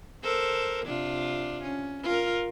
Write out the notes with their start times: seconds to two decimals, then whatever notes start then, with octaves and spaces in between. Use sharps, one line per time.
0.23 A4 A#4 C5
0.85 C3 D4 F4
1.62 C#4
2.03 F4 A#4